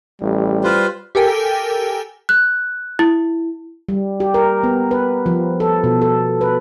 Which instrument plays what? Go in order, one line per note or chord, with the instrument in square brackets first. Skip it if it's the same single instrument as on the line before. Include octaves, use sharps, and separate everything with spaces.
[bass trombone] A1 [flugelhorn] G3
[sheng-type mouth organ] F4 B4 C5
[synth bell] G4 A4 A#4 G5 G#5
[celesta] F#6
E4
[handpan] G3
G4
A#4
B3
B4
F3
A4
B2
A4
B4